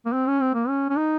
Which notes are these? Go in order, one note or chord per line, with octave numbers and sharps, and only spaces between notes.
A#3
C4
C#4
C4
A#3
C#4
C#4
D#4